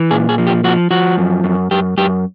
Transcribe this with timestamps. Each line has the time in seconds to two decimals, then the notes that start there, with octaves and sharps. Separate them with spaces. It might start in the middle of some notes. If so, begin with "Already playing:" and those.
Already playing: E3
0.11 A#2 G#4
0.29 G#4
0.38 F3
0.47 G4
0.64 F3 F#4
0.91 F3 F#4
1.18 F#2
1.44 F#2
1.71 F#2 G4
1.97 F#2 G4